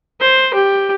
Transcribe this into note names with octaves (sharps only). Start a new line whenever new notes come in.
C5
G4